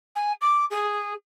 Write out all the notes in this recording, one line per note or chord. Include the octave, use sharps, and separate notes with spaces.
G#5
D6
G#4